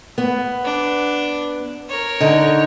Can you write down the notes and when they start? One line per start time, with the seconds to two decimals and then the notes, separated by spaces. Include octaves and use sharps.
0.18 B3
0.65 D4
1.89 A#4 C#5
2.20 D3 D#4